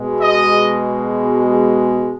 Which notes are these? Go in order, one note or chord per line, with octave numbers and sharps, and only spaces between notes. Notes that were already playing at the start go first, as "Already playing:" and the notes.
Already playing: B2 G#3
D#5